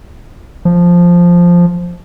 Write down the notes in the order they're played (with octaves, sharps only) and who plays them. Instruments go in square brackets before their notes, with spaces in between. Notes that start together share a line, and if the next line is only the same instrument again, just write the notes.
[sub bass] F3